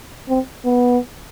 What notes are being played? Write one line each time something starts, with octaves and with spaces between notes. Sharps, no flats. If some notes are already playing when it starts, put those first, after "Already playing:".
C4
B3